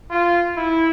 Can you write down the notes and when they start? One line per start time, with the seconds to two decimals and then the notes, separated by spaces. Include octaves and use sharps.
0.10 F4
0.56 E4